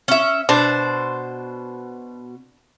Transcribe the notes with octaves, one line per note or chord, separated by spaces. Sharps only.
C#4 E5
B2 D4 C5